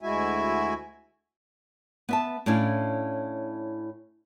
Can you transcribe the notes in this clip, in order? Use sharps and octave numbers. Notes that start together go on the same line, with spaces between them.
D2 G#3 E4 F#4 E5 G#5
B3 E5 A5
A2 C#4 D4 E4 F5